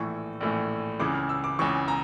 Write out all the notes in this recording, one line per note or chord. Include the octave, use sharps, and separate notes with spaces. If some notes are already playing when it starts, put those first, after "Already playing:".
Already playing: A#1 A2 E3 C#6
A#1 A2 E3
C#2 C#3 E3 D6
F6
E6
D6
C#2 C#3 E3 C#6
A#5